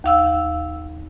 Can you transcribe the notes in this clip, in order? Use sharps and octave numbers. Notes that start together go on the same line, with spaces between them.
D#2 F5 E6